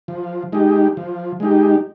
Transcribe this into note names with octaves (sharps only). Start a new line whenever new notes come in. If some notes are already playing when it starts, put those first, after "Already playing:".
F3
G#3 D#4 G4
F3
G#3 D#4 G4